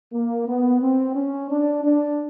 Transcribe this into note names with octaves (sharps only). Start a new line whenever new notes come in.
A#3
B3
C4
C#4
D4
D4